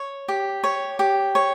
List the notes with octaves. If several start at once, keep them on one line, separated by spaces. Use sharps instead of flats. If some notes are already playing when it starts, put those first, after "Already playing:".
Already playing: C#5
G4
C#5
G4
C#5